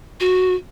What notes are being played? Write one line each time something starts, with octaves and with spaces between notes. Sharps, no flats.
F#4